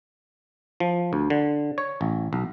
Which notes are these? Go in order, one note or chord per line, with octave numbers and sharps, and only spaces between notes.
F3
D2
D3
C#5
A1
B1